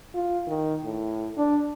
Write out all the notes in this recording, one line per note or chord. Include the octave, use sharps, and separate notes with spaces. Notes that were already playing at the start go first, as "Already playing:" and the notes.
F4
D#3
A2
D4